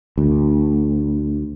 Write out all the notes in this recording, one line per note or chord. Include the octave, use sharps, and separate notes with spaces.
D2